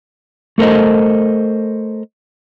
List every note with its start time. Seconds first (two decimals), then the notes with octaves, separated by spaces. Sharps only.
0.58 A3 A4 A#4 C5 D#5